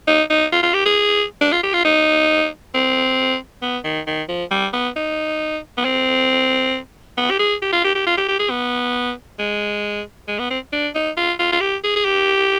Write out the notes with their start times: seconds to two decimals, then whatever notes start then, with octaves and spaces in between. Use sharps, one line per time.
0.07 D#4
0.30 D#4
0.52 F4
0.63 F4
0.74 G4
0.85 G#4
1.41 D4
1.52 F4
1.63 G4
1.73 F4
1.85 D#4
2.74 C4
3.62 B3
3.85 D#3
4.07 D#3
4.29 F3
4.51 G3
4.73 B3
4.96 D#4
5.77 B3
5.85 C4
7.17 B3
7.30 G4
7.39 G#4
7.62 G4
7.73 F4
7.84 G4
7.95 G4
8.07 F4
8.17 G4
8.28 G4
8.39 G#4
8.50 B3
9.39 G#3
10.28 G#3
10.39 B3
10.51 C4
10.73 D4
10.95 D#4
11.17 F4
11.39 F4
11.52 F4
11.61 G4
11.84 G#4
11.96 G#4
12.05 G4